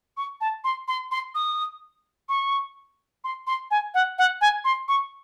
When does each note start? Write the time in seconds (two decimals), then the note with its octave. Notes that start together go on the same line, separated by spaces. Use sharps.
0.17 C#6
0.41 A5
0.64 C6
0.88 C6
1.11 C6
1.35 D#6
2.29 C#6
3.24 C6
3.47 C6
3.71 G#5
3.94 F#5
4.18 F#5
4.41 G#5
4.64 C6
4.88 C#6